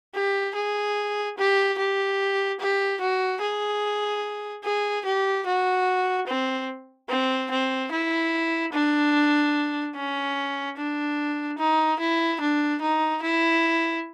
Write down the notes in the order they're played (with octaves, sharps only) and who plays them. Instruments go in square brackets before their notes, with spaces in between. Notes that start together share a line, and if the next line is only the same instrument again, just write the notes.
[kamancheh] G4
G#4
G4
G4
G4
F#4
G#4
G#4
G4
F#4
C4
C4
C4
E4
D4
C#4
D4
D#4
E4
D4
D#4
E4